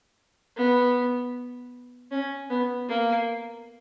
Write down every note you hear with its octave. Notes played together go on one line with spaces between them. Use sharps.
B3
C#4
B3
A#3